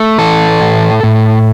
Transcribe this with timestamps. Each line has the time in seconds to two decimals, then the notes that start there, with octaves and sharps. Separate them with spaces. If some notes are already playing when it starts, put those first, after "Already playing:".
Already playing: A3
0.18 E3 A4
0.61 A2
1.03 A2